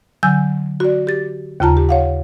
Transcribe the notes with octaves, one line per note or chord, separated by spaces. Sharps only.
D3 F#3 G#5 E6 G6
F#4 D5
G4 A6
D#2 C#3 F4 A5 A#5
G4
C#5 F5 F#5